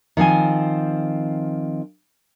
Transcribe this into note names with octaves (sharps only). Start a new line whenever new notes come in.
D#3 F3 C4 G#5